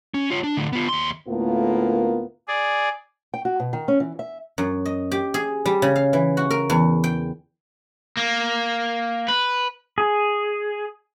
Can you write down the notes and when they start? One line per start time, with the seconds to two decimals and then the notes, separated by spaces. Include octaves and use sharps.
0.14 C#4
0.31 F4 C#5
0.44 D4
0.57 A2 D3
0.73 B3 F4
0.88 D#2 C6
1.28 D2 A2 A#3 B3 F4 A#4
2.48 G#4 D5
3.34 G5
3.45 F#4
3.60 B2
3.73 D#3
3.88 C#4
4.00 E3
4.19 E5
4.58 F#2
4.86 D#5
5.12 G4
5.34 G#4
5.66 G3
5.82 C#3
5.96 F5
6.13 E3
6.37 F#4
6.51 A#4
6.70 E2
7.04 G5
8.17 A#3
9.28 B4
9.98 G#4